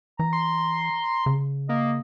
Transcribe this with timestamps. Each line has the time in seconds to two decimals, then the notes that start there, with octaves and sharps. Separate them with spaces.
0.19 E3 A#5
0.33 C6
1.26 C#3
1.69 A#3 D#5